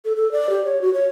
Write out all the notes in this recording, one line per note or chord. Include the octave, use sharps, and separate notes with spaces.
A4
A4
D5
G4
C#5
F#4
C#5